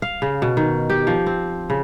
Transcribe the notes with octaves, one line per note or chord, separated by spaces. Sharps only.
F5
C#3
B2
D#3
G4
F3
C4
C#3